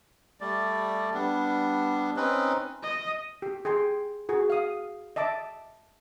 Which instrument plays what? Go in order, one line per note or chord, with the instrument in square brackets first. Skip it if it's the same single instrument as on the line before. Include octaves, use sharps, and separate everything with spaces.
[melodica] G3 A3 D5
G3 B3 D4
C4 C#4 D#4 B4
[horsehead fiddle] D#5
[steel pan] G4
G#4 G5 G#5 C6
F#4 G#4
F5 D#6
D#5 E5 A5 D6